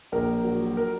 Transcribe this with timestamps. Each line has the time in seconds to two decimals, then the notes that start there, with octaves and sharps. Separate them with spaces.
0.12 A#1 A#4
0.44 F#3
0.77 A#4